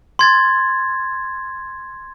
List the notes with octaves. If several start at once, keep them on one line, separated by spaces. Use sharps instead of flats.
C6 G#6 A6